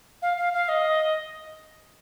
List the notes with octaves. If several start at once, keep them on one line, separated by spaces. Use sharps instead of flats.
F5
F5
F5
D#5